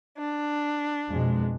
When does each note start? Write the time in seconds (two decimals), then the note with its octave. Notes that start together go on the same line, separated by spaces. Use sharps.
0.19 D4
1.10 F2 B2 G#3